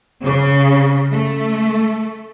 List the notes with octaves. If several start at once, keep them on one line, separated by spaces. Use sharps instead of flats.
C#3
A3